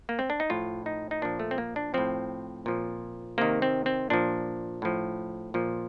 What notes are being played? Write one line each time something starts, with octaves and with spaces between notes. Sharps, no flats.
A#3
C4
D4
D#4
A2 F3 F4
D#4
D#4
A#2 F3 D4
A3
C4
A#3
D4
A2 F3 C4
A#2 F3
C3 D#3 A#3
C4
C4
A#2 F3 D4
A2 F3
A#2 F3